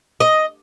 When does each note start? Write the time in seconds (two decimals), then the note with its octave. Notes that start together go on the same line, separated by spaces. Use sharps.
0.20 D#5